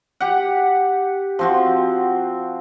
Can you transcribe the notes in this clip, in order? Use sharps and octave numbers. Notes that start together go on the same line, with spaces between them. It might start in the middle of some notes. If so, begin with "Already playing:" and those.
G4 F#5
F3 C4 F#4